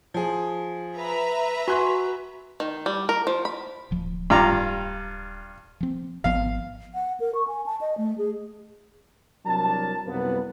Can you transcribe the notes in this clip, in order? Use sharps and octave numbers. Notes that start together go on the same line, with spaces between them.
F3 G#4
B4 E5 A#5
F#4 G#5 C6 F#6
D#3
G3
A#4
F3
B5
D1 F3
G2 F4 A#5
F3 C4
G#1 F3 B3 F5
F#5
A#4
C#6
G#5
A5
D#5
A3
G#4
C2 F#3 D4 A#4 A5
C2 F#2 A#3 B3 B4